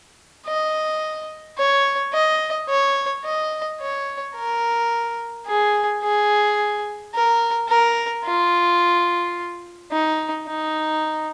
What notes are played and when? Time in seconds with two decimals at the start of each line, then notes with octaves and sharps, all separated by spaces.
0.47 D#5
1.59 C#5
2.13 D#5
2.70 C#5
3.25 D#5
3.81 C#5
4.36 A#4
5.47 G#4
6.03 G#4
7.15 A#4
7.69 A#4
8.26 F4
9.92 D#4
10.48 D#4